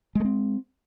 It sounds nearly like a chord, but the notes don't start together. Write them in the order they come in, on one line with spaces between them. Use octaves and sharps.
G#3 A3 C4